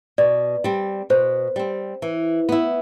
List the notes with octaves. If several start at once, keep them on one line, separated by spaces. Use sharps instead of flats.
B2 D5
G3 C4
B2 C5
G3 C4
E3
B3 E4